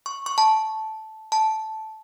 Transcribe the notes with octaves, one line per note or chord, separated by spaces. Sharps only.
C#6
C#6
A5
A5